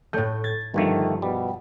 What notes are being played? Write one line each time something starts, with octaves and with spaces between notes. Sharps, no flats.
A2 A3 C#5 G6
G#6 A6
G1 G2 D3 D#3 F3 A3
B2 G3